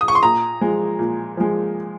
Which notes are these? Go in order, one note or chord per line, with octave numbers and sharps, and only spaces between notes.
D#6
C#6
C6
A#2 A#5
F3 G#3
A#2
F3 G#3